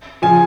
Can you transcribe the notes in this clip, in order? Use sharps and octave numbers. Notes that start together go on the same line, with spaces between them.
C#3 F3 G#5